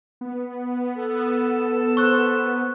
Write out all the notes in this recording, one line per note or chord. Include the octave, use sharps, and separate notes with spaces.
B3
A4
C5 C#6 E6 F#6